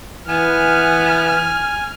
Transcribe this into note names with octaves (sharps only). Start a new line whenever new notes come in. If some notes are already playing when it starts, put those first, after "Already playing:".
E3 B3 G#5 F6